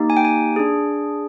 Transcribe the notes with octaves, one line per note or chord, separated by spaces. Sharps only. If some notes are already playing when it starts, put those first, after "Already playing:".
Already playing: A#3 D#4 G4
G#5
G5
G#5
D4 G#4